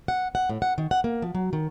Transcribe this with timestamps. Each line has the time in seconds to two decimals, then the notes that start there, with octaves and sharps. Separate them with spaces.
0.08 F#5
0.35 F#5
0.50 A2
0.62 F#5
0.78 D#3
0.91 F#5
1.04 A#3
1.22 F3
1.35 F#3
1.53 D#3